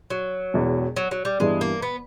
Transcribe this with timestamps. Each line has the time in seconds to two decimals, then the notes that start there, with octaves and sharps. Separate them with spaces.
0.10 F#3
0.54 E1 E2 B2
0.96 F#3
1.11 F#3
1.25 G3
1.40 G2 E3 G3 G#3 B3
1.61 A#3
1.82 B3